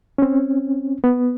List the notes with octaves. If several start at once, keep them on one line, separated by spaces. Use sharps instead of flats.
C4 C#4
B3